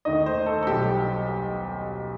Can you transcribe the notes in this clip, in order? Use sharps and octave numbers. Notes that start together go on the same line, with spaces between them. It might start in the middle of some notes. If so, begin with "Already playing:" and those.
D#2 D#3 A3 D#4 D#5
C5
A4
A4
B1 B2 G3 G4